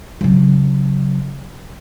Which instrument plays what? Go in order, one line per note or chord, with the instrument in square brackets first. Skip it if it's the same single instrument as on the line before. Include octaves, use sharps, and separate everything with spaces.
[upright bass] C#3 F#3